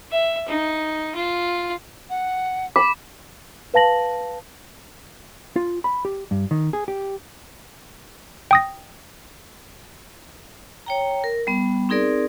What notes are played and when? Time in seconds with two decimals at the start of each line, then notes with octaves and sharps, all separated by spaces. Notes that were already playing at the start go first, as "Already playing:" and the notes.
0.11 E5
0.48 D#4
1.15 F4
2.10 F#5
2.76 B5 D6
3.74 B4 F5 A5 A#6 F#7
5.56 F4
5.84 B5
6.05 G4
6.31 G2
6.51 D#3
6.73 G#4
6.88 G4
8.51 G5 D#6 A#6
10.86 C#5 G5 A#5
11.24 A#4
11.47 G3 B3
11.89 C4 D#4 G#4 A#4 D5